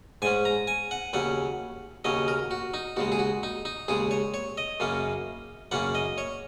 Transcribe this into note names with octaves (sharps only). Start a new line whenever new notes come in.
G#2 G#3 C#4 G#5
A#5
G#5
F#5
D#2 C#3 F#3 C#4 F#5
D#2 C#3 F#3 C#4 D#5
A#4
F#4
D#4
D#2 C#3 G#3 F#4
G#4
F#4
D#4
D#4
D#2 C#3 G#3 G#4
C#5
C#5
D#5
F#2 C#3 A#3 C#4
F#2 C#3 A#3 C#4 F#5
D#5
C#5